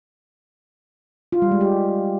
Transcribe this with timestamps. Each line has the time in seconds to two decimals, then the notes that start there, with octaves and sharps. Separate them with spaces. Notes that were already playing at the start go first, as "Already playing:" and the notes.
1.32 F4
1.42 G3
1.51 G#3
1.61 G4